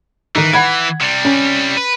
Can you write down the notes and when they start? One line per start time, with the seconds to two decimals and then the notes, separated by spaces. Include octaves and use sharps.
0.35 D#3 E3 D#4
0.53 F#5 B5 G#6
1.01 C3 G3
1.25 C#4
1.77 B4